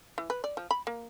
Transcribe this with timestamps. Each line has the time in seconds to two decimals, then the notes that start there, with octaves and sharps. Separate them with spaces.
0.18 E3
0.30 B4
0.44 D5
0.57 F3
0.71 B5
0.87 A#3